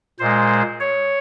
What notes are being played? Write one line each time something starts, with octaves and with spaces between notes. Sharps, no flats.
A#2 G#3 C5
C#5